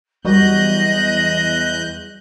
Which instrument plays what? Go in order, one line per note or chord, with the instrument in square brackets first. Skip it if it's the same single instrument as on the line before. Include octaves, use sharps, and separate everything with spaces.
[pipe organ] E2 F#6 G6 [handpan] F#3 G3 F#4 [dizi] D#5